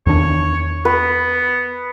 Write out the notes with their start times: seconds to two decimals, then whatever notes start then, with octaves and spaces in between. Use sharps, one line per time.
0.07 E2 D#3 D4 C#5
0.85 B3 B4